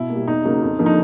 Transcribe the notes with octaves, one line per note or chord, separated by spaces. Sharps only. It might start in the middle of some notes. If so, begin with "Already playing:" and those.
Already playing: B2 E4
A#3
G3
E2 D#4
C#3 F#3 A#3
F2
D3 F3 A#3
D#4